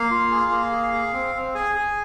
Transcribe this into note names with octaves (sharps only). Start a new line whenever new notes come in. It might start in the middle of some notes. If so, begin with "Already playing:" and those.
Already playing: A#3 F5
F4
G#4
A#3
G#4
G#4
C4
C4
G#4 G#5
G#4